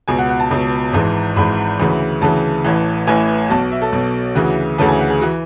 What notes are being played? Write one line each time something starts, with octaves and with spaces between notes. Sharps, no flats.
C#2 B2 G#5
F#5
F#5
A5
C#2 B2
G#1 G#2 E3
G#1 G#2 E3 B5
D2 C#3 E3
D2 C#3 E3 A5
A1 A2 E3
A1 A2 E3 G#5
B1 B2 A5
E5
A4
B1 B2
D2 C#3 E3 F#4
D2 C#3 E3 A4
G#5
F#5
G#4
E3 F#4